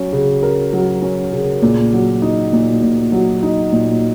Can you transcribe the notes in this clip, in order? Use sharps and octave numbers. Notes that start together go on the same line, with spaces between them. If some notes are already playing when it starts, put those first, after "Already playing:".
Already playing: F#3 C#4
C#3
A#4
F#3
C#4
C#3
A#2
F#3
D#4
A#2
A#2
F#3
D#4
A#2